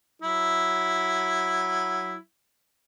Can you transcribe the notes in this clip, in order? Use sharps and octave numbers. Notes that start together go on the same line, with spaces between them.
F#3 E4